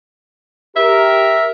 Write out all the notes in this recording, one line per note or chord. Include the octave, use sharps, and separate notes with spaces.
G4 A#4 E5